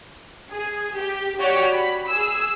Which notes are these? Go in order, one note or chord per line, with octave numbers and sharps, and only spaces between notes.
G#4
G4
F#4 G4 C#5 D5
B5
G#4 E6